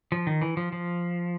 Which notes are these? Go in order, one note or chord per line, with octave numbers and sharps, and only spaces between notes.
F3
D#3
E3
F3
F3